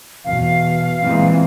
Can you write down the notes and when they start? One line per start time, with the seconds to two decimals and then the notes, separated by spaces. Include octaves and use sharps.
0.25 E2 B2 F5
1.02 A#2 E3 G#3 C4